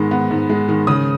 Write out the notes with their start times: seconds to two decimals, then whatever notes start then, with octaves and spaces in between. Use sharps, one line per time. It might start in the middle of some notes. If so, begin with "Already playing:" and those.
Already playing: G#2 D#3 G#3 B3
0.11 B3
0.31 G#2
0.49 G#3
0.68 D#3
0.87 C#3 D#6